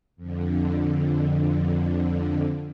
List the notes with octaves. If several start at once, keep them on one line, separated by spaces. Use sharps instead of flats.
F2 D3